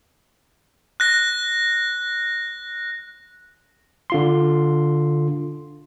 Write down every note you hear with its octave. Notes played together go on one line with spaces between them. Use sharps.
F#6 A#6
D3 F4 C6